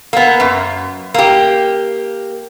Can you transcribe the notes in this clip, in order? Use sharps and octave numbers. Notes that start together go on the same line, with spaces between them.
A#3 B3
F#2
A#3 G4